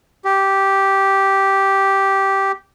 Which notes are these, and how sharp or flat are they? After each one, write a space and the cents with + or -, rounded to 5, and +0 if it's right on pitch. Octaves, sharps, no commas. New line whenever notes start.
G4 -5